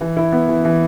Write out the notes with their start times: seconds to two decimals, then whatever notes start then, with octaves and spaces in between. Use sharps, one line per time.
0.01 E3
0.17 E4
0.32 B3
0.48 E3
0.65 E3